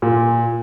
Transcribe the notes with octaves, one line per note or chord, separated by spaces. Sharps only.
A#2